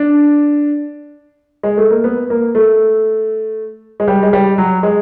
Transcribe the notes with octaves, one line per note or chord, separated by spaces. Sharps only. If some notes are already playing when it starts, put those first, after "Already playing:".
Already playing: D4
G#3
A3
A#3
B3
A#3
A3
G#3
G3
G#3
G3
F#3
G#3